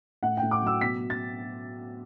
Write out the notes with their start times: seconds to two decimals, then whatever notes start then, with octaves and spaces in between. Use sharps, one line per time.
0.23 A2 F#5
0.37 G5
0.43 A2
0.51 D6
0.62 F#3 E6
0.80 B2 B6
1.00 B2
1.10 A6